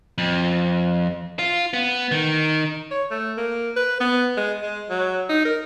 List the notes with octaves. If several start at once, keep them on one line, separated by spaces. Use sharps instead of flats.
F2
F4
B3
D#3
C#5
A3
A#3
B4
B3
G#3
G#3
F#3
D#4
A#4